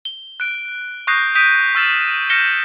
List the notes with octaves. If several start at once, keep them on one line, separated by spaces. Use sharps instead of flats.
G7
F#6 D7
C#6 D#6 F#6 G6 A#6 C7
D#6 G6 B6 D7 D#7
C#6 E6 F6 A6 E7
F6 G6 A#6 C#7 E7 G7